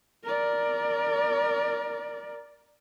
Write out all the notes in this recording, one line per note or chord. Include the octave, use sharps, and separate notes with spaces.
A#4 D5